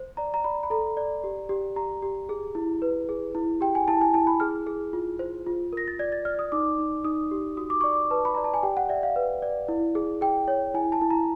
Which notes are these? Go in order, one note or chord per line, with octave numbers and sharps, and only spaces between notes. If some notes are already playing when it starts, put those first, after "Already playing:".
Already playing: C5
D5 A#5
A#5
D5 B5
B5
A4 A#5
D5
G4
G4
G4 A#5
G4
G#4
E4
B4
G#4
E4
G4 G5
G#5
E4 A5
G#5
E4 A5
B5
G#4 F6
G#4
F4
C5
F4
A#4 A#6
A6
D5 G#6
A6
D5 F6
D#6
D#4 D6
D#4
D#4 D#6
G4
F#4 D#6
D6
D5 C#6
D6
B4 A5
B5
D5 A#5
A5
G#5
G4 G5
F#5
D5 E5
F5
B4
D5
E4
G#4
G#4 G5
C#5
E4 G#5
A5
E4
A#5